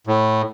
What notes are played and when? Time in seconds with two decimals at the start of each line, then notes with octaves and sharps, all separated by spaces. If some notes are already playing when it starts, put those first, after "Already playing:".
0.07 A2